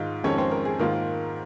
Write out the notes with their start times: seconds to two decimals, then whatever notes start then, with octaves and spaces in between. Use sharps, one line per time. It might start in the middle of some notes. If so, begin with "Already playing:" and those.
Already playing: G#2 D#3 G#3 D#4 F4
0.24 F2 D#3 G#3 C#4 C#5
0.38 C4 C5
0.51 A#4
0.65 G#4
0.79 G#2 D#3 A#3 F4 A#4